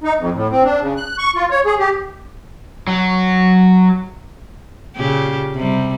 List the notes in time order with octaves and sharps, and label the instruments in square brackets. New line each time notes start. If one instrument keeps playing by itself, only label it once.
[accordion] D#4
F2
A2
C4
D4
C#3
F#6
C#6
F4
C#5
G#4
G4
[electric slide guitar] F#3
[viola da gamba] A#2 C#3 G4
C3 G3